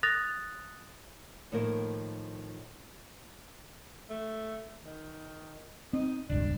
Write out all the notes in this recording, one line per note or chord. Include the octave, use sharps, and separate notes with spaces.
D#6 F#6 A6 A#6 F7
A2 D#3 F3 A#3 A#4
A3
D#3
C4 D#4
E1 C#2 G2 D4